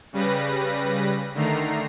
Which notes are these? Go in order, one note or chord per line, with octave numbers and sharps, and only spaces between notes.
C#3 G3 B4 A#6
D3 D#3 A3 A#5 C7